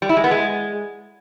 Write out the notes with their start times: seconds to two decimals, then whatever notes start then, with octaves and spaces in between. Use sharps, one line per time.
0.02 G3
0.09 E4
0.17 G#3
0.24 B3
0.31 G#3